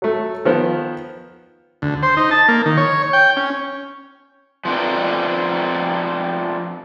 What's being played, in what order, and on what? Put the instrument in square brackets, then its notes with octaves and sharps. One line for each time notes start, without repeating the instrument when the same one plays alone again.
[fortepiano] F#3 A3
D#3 F3 B3
[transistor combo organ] D2
C5
D#4
A5
A#3
D#3
C#5
G5
C#4
[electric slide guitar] F3 A3 B3 C4 D4 A#4